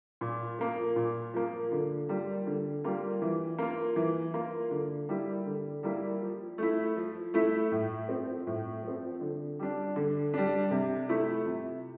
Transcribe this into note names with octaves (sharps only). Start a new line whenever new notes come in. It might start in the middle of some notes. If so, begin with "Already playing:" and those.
A#2
F3 A#3
A#2
F3 A#3
D3
G3 A#3 F4
D3
G3 A#3 F4
E3
A#3 F4
E3
A#3 F4
D3
G3 A#3 E4
D3
G3 A#3 E4
F3
A3 E4
F3
A3 E4
A2
F3 C4
A2
F3 C4
D3
G3 D4
D3
G3 D4
C3
F3 A3 E4
C3